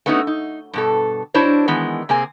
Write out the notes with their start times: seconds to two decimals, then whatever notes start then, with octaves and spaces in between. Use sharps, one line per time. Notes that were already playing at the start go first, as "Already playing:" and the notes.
0.06 A3 B3 C#4 D#4 F4 F#4
0.27 D#4
0.74 G2 B2 A4
1.34 D4 E4 F#4 C5 C#5
1.68 D#3 E3 G#3 B3
2.09 C3 A#3 C4 G#4 G#5